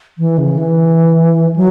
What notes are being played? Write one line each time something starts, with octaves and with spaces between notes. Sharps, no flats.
E3
C#3
E3
F#3